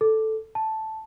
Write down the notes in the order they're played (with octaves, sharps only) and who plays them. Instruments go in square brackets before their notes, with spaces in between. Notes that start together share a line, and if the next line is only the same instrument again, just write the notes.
[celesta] A4
A5